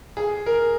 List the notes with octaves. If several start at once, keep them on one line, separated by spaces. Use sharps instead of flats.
G#4
A#4